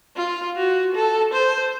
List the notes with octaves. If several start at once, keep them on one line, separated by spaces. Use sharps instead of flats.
F4
F#4
A4
C5